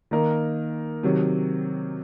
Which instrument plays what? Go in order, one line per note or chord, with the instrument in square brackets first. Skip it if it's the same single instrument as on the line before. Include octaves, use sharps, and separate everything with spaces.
[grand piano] D#3 A#3 D#4 A#4
C3 D#3 F#3